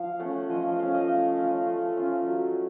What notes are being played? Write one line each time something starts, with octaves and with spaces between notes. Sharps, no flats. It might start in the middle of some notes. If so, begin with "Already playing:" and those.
Already playing: F3 F5
A3 C#4 F#5
F3 D#5
F5
A3 C#4 F5
D#5
A3 F5
C#4 F4
F5
A3
C#4 F4
F#3